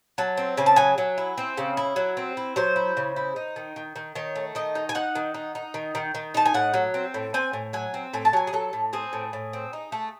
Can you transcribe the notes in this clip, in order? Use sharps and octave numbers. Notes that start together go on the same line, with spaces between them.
F#3 A5
C4
C#3 G#5
A5
F#3 G#5
F#3
E4
C4
C#3
E4
F#3
C4
E4
F#3 C5
E4
C#3
E4
D#4
D#3
D#3
D#3
D#3 C#5
A3
D#3 D#5
D#4
G#5
D#4 F#5
D#3
D#4
D#4
D#3
D#3
D#3
D#4 A5
G#5
A2 F#5
F#3
C4
A2
C4 G#5
A2
F#3 G#5
C4
A2 G#5
A5
F#3 G#5
G#4
F#3 A4
A2
C4 G#4
A2
A2
C4
D#4
A3